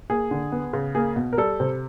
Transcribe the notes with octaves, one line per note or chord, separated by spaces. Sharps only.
A#3 G#4
D3
B3
C#3
A#3 G#4
B2
A#4
G3 A4
C3